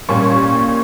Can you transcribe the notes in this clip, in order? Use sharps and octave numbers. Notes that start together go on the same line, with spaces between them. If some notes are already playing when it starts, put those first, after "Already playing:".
A#2 G3 A#3 C#4 C#6